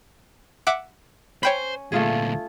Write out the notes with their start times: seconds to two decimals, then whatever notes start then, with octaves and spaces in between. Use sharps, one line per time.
0.67 E5 F#5 D6
1.43 C#4 C5 C#5 G5 B5
1.92 D2 A#2 A3 F4 G#4